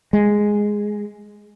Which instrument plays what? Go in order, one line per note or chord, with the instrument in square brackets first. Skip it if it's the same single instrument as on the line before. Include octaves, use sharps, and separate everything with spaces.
[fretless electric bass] G#3